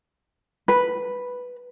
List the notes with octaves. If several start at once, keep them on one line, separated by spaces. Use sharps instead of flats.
B4